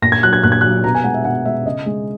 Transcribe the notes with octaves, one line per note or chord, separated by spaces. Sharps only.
A#2 A#6
G#6
F#3 F#6
G#6
A#2 F#6
G#6
F#6
F#3
B2 A#5
G#5
G#3 F#5
E5
B2 F#5
G#3 E5
C#3 D#5
G#3